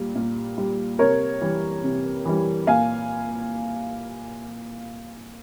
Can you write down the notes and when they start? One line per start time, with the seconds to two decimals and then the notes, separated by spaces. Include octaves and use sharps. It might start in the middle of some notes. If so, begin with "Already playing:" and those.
Already playing: A#2 G3
0.15 A#2
0.58 G3
0.99 C3 A#4 C#5
1.42 E3 G3
1.83 C3
2.25 E3 G3
2.67 A#2 F5 G#5